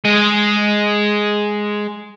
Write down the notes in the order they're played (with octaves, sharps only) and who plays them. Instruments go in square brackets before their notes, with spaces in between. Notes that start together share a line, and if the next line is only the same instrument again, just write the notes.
[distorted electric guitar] G#3 D#5